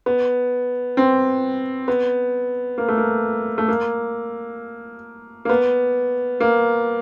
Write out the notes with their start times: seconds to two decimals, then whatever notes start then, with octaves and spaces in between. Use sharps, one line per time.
0.06 B3
0.97 C4
1.88 B3
2.78 A#3
2.88 A3
2.97 A#3
3.58 A3
3.68 A#3
5.45 A#3
5.49 B3
6.40 A#3